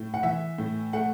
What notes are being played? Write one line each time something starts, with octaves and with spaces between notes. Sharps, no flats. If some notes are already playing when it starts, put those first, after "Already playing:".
Already playing: A2
F#5
E3 E5
A2
A3 F#5